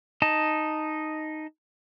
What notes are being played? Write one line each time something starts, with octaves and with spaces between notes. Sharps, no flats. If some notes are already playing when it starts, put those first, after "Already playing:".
D#4 D#5 A5